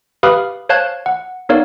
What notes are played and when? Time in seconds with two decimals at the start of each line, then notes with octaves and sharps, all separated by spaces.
0.23 G4 B4 F5 B5 D#6 F6
0.69 C5 C#5 F5 A5 F#6 G#6
1.06 F#5
1.49 B3 D#4 A#4 C#5 D5 F5